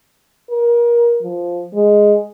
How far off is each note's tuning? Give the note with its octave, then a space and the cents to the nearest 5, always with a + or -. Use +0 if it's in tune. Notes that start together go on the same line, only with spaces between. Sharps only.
A#4 +25
F3 +0
G#3 +0